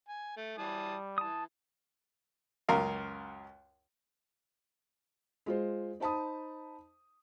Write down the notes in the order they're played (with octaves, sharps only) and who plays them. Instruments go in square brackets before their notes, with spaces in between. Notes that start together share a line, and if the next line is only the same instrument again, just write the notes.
[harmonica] G#5
A3
[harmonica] E3 A5 D#6 [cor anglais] G3
[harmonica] E3 [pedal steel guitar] A5 D#6
[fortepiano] C#2 F#2 A#4 F5
[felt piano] G#3 F4 C5
D#4 C5 A5 B5 D#6